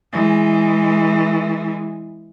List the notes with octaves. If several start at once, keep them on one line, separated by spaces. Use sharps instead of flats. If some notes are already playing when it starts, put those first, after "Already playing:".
E3 G#3